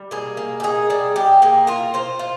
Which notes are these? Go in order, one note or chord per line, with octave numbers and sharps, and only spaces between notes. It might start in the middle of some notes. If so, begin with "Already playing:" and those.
Already playing: G3
A#3 G#4
A#3
G4
D#4 G#4
G3 G#4
G3 G4
A#3 G#4
F4 A#4
F4 C5
F4